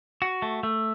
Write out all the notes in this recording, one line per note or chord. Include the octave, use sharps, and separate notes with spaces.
F#4
A3
A3